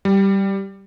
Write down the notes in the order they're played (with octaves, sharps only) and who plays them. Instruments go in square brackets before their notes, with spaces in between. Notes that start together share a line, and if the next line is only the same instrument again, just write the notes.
[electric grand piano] G3